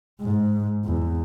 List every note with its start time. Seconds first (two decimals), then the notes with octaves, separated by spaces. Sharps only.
0.22 G#2
0.85 E2